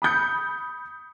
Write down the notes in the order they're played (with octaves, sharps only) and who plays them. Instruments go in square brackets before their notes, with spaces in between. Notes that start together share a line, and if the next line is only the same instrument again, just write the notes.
[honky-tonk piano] B5 D#6 G6 C#7